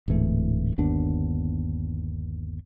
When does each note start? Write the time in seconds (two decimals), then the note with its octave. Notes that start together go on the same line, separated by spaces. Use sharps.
0.08 D1 G#2 E3 A3
0.78 G1 D#2 B3 D4